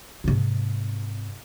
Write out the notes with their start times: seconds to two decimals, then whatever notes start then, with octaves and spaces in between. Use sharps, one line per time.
0.24 G#2 C3